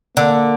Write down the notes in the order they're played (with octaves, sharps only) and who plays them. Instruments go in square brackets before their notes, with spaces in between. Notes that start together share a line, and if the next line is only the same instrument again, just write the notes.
[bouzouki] D3 [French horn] A#3